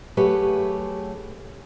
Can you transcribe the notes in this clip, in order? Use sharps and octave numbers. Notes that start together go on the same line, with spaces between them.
F#3 A3 G4 G#4 B4 C#5